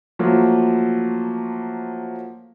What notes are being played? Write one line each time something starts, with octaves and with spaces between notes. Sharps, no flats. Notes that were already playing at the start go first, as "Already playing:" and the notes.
F3 F#3 A3 A#3 F4